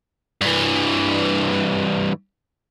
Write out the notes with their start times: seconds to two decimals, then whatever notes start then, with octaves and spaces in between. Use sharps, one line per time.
0.41 G2 E3